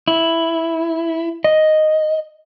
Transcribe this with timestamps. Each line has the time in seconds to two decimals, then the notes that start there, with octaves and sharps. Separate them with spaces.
0.08 E4
1.44 D#5